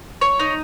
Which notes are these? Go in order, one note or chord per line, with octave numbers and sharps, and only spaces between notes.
C#5
D#4